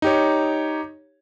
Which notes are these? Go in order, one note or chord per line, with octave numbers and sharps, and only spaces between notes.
D#4 G4 C#5